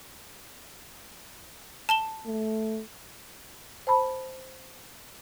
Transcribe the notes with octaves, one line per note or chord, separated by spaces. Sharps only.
A5 E7 G7
A3
C5 A5 B5